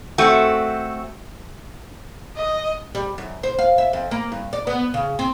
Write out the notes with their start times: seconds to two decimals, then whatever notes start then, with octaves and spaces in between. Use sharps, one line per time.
0.18 A3 C4 F#4
2.37 D#5
2.95 G3
3.18 F#2
3.43 C5
3.59 F5
3.78 E5
3.93 F2
4.11 A#3
4.32 G2
4.53 D5
4.67 B3
4.94 C#3
5.19 C4